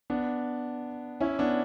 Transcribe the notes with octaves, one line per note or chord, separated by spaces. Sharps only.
B3 D4
C#4 E4
B3 D4